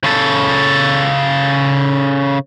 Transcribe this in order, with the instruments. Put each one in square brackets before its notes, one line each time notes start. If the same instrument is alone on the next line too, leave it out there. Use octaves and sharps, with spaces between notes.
[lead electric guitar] C#3 A4